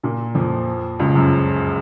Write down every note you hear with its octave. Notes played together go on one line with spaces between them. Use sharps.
A#2 A#3
F2 F3
C#2 C#3
F#2